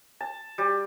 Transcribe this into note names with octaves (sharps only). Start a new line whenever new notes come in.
A5
G3